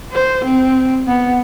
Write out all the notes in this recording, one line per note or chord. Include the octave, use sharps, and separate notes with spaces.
C5
C4
B3